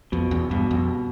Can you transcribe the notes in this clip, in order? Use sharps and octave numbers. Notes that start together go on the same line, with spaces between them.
F2 B2
E2
G2 B2
F2